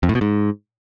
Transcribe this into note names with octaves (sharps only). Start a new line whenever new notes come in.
F2
A2
B2
G#2